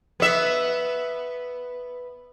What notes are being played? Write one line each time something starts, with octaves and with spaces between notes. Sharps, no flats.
B3 E5